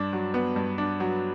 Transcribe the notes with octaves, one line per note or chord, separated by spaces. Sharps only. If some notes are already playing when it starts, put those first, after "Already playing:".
Already playing: G2 D4
F#3
B3
G2
D4
F#3